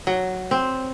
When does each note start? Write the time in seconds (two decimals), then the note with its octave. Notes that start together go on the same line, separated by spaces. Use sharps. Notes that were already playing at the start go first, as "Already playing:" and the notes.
0.07 F#3
0.51 C4